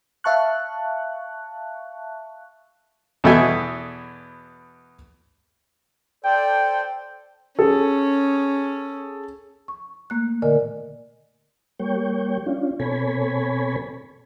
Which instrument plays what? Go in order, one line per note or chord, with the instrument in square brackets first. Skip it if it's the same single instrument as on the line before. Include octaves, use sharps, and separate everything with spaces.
[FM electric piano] E5 F5 A5 C#6 F#6
[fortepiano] E2 B2 A4 D#5 E5 G#5
[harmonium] A4 C5 D5 [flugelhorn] G5
[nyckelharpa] C#4 [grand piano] G#4 A4
[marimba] C#6
A3 A#3 F#6
A#2 D3 A#4 D5 D#5 G#5
[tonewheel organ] G3 A#3 C#5 G5
C#4 D4 F4
B2 C4 A4 C#5 G#5 B5